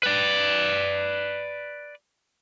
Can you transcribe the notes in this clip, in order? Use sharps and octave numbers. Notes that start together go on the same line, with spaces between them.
B4 D5